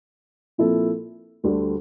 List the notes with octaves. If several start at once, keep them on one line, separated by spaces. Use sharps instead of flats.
A#2 F3 C4 E4 A4
D2 D3 G3